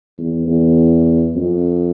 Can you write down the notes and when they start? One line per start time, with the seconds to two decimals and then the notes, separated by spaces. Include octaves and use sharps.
0.18 E2
0.47 E2
1.36 F2